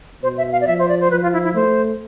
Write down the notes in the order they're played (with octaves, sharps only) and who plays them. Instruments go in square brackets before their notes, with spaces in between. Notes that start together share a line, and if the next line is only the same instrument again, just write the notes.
[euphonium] B2 [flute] C5
[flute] E5
F5
D5
[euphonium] F3 [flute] E5
[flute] C5
D5
C5
[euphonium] F3 [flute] B4
[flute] F4
E4
E4
[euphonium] A3 [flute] C5